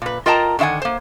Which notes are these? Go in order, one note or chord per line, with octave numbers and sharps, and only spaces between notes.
A#2 B4
F4 A#4 D#5 G5 A5 A#5
D3 D#3 E5 F#5 G#5
A#3 C5